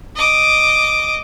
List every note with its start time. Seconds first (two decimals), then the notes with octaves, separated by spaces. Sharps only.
0.16 D#5 D6